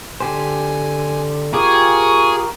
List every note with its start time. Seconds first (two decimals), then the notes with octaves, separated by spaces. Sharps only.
0.20 D3 G4 C5 G#5
1.54 F4 G4 G#4 A#4 C#6 D6